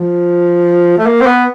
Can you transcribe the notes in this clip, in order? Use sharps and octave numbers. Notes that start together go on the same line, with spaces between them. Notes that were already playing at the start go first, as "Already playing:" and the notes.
Already playing: F3
A3
A#3
C4
B3